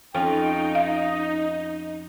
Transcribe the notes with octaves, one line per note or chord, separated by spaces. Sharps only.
F2 C#4 D#4 F4 G5
D#5 F5